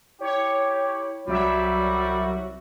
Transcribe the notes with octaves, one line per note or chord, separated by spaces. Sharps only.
E4 G4 C#5
C2 F#3 G3 F#4 E5